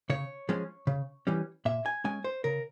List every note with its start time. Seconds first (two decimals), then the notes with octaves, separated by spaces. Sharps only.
0.10 C#3 C#5
0.49 F3 G#3 C#4
0.87 C#3
1.27 E3 G3 C#4
1.65 A#2 E5
1.86 G#5
2.04 G#3 C#4 G#5
2.24 C5
2.44 C#3 A#4